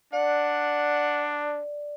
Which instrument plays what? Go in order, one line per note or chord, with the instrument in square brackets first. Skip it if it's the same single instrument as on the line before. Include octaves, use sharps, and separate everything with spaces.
[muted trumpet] D4 [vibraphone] D5 [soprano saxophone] F#5